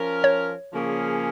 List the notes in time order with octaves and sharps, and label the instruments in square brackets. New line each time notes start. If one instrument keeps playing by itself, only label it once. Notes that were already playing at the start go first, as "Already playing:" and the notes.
Already playing: [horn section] F3 C#4 A#4
[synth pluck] C#5
[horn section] C#3 F3 A#3 C#4 G#4